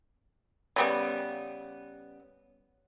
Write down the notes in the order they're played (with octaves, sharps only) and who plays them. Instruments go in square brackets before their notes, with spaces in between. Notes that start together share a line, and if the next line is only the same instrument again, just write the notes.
[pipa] C#3 G3 B3